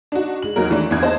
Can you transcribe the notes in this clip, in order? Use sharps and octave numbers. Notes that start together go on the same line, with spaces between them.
D4 D#4 F#4
G#3 F#7
E2 F#3 D#4 A#4
D#3 E3 A3 D4
E2 B3 D4 E4 G#6
C5 D#5 A5